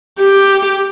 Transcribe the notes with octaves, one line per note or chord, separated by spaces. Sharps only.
G4